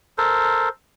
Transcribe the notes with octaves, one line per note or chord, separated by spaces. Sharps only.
A4 A#4 C5